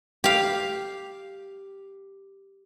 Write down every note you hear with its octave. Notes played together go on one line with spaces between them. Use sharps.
G4 F5